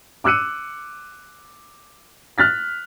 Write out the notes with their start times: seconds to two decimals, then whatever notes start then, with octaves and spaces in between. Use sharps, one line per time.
0.24 D6 E6 F#6 C#7 D#7
2.38 F6 F#6 A6 B6